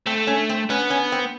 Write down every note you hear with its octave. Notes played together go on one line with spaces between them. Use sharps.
A3 C4
C#4
C4
B3 C#4
C#4
C4